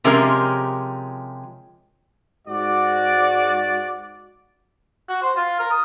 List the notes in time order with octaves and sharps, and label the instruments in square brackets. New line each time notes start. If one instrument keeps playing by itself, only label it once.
[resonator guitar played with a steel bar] C3 F3 G#3 C#4 G4 A#4
[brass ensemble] G#2 F#4 D5
[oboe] F#4
C5
F4
A#4
D#6